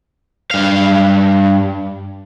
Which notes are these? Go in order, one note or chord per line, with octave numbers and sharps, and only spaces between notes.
G2 F5